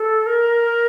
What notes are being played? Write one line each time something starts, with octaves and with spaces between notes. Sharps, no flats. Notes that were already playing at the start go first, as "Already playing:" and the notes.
Already playing: A4
A#4